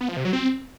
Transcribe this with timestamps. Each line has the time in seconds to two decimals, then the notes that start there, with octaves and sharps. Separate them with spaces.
0.01 B3
0.09 F3
0.17 C3
0.25 F#3
0.33 C4